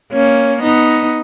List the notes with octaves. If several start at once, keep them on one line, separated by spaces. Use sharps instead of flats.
A#3 C#4
B3 D#4